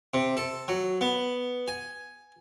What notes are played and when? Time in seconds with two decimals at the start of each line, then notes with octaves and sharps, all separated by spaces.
0.14 C3
0.37 A4
0.68 F#3
1.01 B3
1.68 G#5